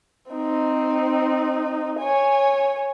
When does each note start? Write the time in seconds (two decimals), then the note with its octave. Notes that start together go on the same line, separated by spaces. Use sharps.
0.32 C4 D#4
2.00 C#5 G#5